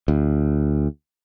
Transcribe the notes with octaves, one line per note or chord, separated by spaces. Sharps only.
D2